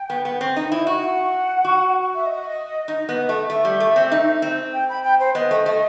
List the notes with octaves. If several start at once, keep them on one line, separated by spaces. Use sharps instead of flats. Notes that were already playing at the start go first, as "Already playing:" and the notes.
Already playing: G5
B3
B3
C4
D#4
E4
F#4
F#5
F#4
E5
D#5
D#4
B3
A3
A3 E5
G3
A3
C4
D#4
C4
G5
B5
G5
C5
B3 D#5
A3
A3